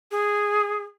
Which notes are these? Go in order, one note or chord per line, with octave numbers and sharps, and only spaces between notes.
G#4